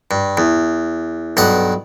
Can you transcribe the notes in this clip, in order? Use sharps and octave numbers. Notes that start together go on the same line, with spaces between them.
G2
E2
B1 G2 F#5